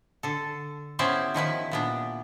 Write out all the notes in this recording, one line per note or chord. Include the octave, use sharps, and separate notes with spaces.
D3 A4
B3 C#4 E4 G4 C5 D5
D#3 F3 E4 B4
A#2 B3 D4